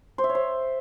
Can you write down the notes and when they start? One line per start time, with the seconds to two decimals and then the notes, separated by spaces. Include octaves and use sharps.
0.18 C5
0.24 E5
0.29 C#5
0.35 C5